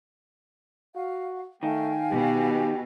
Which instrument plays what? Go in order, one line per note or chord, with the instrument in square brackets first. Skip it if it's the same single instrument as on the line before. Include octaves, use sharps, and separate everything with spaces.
[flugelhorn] F#4 [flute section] F5
[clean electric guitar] D#3 [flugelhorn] A3 [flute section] F5 G5 G#5
[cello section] B2 [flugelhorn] G4